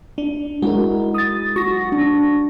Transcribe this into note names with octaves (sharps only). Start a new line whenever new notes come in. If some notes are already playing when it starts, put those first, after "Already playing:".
D4
G#3 E4 F#4 A#4
D#6 A6
F#4 C#6 A#6
D4